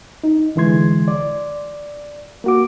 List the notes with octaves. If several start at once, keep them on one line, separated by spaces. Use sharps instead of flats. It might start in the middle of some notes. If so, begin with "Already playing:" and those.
D#4
C2 D3 E3 G#3 C6 G#6
D5
A#3 F#4 D6